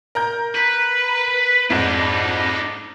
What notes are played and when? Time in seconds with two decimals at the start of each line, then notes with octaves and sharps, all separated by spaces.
0.15 A#4 A#5 G6
0.55 B4
1.70 F2 G#2 D4 D#4